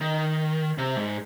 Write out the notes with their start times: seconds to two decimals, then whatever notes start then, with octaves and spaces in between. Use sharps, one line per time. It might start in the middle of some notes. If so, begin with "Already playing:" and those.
0.01 D#3
0.78 C3
0.96 G#2